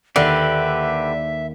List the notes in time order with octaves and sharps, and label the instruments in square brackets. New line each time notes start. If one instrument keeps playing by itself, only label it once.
[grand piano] D#2 [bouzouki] D3 [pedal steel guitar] G4 B4 [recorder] E5